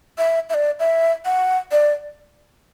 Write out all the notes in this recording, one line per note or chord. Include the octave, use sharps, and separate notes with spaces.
E5
E5
D5
E5
F#5
D5